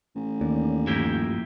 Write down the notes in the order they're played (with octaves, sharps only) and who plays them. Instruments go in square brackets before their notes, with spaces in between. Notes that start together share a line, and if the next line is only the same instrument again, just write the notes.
[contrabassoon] A1
[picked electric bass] D#2 [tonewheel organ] D4
[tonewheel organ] G2 F3 [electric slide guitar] A#3 E4 G4